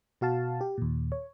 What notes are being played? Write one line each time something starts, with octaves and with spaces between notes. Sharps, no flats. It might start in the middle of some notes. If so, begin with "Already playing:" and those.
B2 F#4 F5 A5
G4
D#2 A#2
C#5